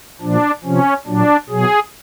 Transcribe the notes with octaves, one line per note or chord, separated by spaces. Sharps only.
A#2 F3 D4
C3 F3 C#4
A#2 F#3 D4
B2 F#3 G#4